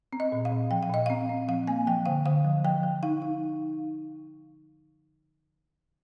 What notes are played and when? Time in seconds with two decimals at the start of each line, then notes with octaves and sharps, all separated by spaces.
0.13 C4
0.20 D#5
0.32 A#2
0.45 F5
0.52 A#2
0.71 F3 G5
0.83 F5
0.90 A#2 D#5
1.06 C4 F5
1.29 C4
1.48 F3 F5
1.67 A#3 G#5
1.87 F3 G5
2.06 D3 F5
2.26 D3 F5
2.45 F3
2.65 F3 G5
2.83 F3
3.03 D#4 F5
3.22 D#4